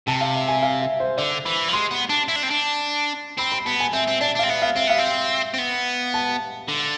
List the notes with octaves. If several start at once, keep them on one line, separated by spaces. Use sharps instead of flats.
C3 A5
F5
E5
G#5
F5
E5
C5
D3 D5
E3 B5
F3
G#3 C6
B3
D4
E4
D4
C4
D4
C4 B5
B5
B3 A5
G#5
C4 E5
C4
D4 D5
D4
C4 F5
B3 E5
F5
C4 E5
B3 F5
C4
C4
B3
A5
D3